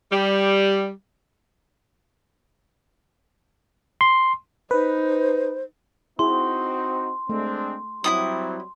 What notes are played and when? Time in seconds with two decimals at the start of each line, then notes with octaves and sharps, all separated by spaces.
0.12 G3
4.01 C6
4.71 D#4 B4 C5
6.19 C4 D#4 E4 F#4 G#4 C6
7.29 G#3 A3 C4 D4
8.04 F#3 G3 C4 E4 F4 D#6